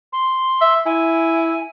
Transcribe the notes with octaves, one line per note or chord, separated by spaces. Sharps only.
C6
E5
E4 G#5